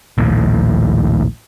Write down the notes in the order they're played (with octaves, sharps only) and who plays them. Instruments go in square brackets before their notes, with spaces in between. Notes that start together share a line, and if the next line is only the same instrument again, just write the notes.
[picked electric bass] A#1 D#2 A2